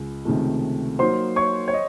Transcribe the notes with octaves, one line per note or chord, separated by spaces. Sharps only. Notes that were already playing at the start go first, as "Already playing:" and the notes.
Already playing: C#2
C#2 C3 D#3 A3
F#3 A#3 D#4 C5 C6
C#5 C#6
C#5
D#5